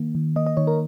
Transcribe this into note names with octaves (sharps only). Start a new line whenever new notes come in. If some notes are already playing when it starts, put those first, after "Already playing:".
Already playing: D#3 A#3
D#3
A#3 D#5
D#5
D#3 C#5
A#4